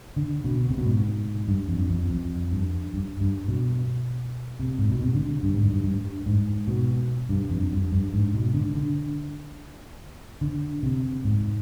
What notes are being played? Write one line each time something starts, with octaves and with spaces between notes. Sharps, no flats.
D3
B2
C3
B2
G#2
G2
F2
F2
F2
G2
G2
G2
B2
C3
G#2
B2
C3
D3
G2
G#2
G2
G2
G#2
B2
G2
F2
G2
G2
G#2
B2
D3
D3
D3
C3
G#2